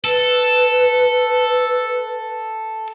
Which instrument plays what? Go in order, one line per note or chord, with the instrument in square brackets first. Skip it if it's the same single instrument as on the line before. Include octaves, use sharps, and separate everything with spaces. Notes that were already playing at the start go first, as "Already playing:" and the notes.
[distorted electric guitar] A4 [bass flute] B4